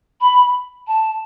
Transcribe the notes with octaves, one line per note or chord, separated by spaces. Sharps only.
B5
A5